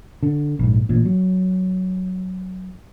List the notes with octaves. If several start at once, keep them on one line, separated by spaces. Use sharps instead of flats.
D3
A#1 G#2
A1 A#2
F#3